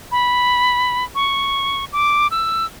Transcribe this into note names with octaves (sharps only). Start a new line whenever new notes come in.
B5
C#6
D6
E6